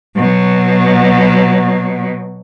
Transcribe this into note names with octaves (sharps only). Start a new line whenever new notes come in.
B2 F#3